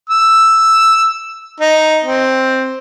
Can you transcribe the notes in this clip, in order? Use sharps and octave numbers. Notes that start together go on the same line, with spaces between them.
E6
D#4
C4